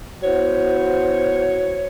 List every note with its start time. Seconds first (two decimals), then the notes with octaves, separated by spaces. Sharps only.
0.23 B3 E4 F#4 C5 C#5